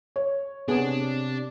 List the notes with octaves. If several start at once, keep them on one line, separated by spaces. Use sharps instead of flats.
C#5
C3 B3 D4 G#4